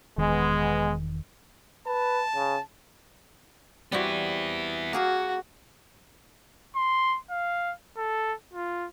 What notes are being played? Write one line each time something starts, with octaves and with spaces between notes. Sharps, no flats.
E1 D#3 G#3 B3
B4 A5
C#3
G3 B3 C4 E4 F#4
A#3 F#4 G#4 A#4
C6
F5
A4
F4